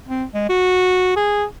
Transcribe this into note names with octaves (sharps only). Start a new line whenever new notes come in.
C4
G#3
F#4
G#4